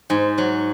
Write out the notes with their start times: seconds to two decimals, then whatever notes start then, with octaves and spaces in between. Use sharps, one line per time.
0.10 G#2
0.38 F#3